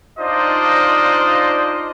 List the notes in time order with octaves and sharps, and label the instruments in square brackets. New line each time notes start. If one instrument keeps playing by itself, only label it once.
[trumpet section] D4 D#4 F4 C5 D5 D#5